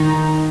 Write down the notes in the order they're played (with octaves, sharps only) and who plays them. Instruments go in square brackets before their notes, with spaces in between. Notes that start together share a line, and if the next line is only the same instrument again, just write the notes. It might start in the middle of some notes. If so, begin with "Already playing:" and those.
Already playing: [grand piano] D#3 [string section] D#4